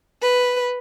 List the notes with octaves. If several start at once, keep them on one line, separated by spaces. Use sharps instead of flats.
B4